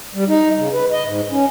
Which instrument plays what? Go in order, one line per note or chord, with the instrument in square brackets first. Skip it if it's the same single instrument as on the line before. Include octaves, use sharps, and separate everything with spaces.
[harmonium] G3
D#4
C#3
B4
D#5
G#2
C#4